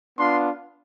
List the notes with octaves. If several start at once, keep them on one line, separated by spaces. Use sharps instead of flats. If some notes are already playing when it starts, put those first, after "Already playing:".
B3 D4 F4 C6